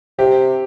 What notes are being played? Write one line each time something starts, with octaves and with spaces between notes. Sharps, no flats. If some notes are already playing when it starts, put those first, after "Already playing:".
C3 G4